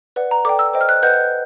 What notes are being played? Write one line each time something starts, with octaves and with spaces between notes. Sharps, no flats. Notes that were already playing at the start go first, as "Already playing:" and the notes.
B4 D5 F#5
A#5
A4 D5 G5 D6
E6
C5 D#5 G5
F6
F#6
B4 D#5 F#5 G6